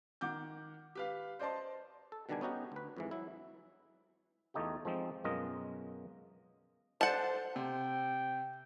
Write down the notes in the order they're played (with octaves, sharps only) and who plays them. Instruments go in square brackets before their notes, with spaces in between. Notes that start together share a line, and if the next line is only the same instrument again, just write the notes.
[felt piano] D#3 F#5 D6 G6
G4 B4 F5
C5 D5 D#5 A5 C6
[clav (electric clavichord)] A4
B2 D3 D#3 G3 D4 G#5
B3 C#4 D#4 F#4 G4
D2 B4
F2 G#2 E3
F#3 E4
E2 A3 D#4 F4 G4
F3 G#3 C4 D#4
F#2 B2 G#3 F4 A#4 D#5
[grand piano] A4 D5 G6 [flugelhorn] C5 [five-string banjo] F#5 A5
[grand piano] C3 [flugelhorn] G5